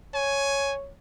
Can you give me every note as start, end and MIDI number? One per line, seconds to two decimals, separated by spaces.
0.14 0.91 73
0.14 0.74 80